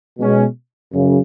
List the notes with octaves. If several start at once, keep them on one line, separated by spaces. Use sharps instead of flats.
B2 G#3 C#4
F#2 C#3